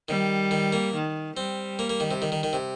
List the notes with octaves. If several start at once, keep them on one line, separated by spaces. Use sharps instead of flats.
D#3 G3
D#3
A#3
D#3
G3 C4
A#3
A#3
D#3
C3
D#3
D#3
D#3
C3